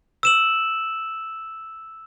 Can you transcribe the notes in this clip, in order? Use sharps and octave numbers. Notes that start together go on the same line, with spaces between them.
E6 E7 F#7